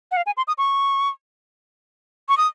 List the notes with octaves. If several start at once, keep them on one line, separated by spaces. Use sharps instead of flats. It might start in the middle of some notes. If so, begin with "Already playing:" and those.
F#5
F5
G#5
C6
D#6
C#6
C#6
D#6